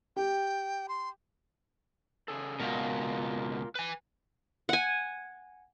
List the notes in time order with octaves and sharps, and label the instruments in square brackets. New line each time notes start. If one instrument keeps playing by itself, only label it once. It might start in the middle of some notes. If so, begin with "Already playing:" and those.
[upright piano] G4 [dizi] G5
[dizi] C6
[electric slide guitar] C#3 G#4 A4
[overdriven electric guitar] C#2 B2 [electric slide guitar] F4 A#4
[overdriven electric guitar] B4 G#5
[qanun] F#5 G#5